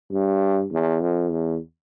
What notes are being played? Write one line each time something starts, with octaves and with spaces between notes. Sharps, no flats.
G2
E2
F2
E2